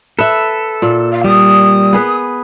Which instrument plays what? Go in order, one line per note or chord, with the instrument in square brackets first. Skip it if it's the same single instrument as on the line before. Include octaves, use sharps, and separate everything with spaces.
[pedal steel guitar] A4 [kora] B4 E5
[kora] A#2
[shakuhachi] F5
[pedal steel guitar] G3 [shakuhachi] D#6
[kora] B3 G#4 B4